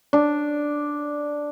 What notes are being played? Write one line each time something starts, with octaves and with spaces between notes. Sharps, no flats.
D4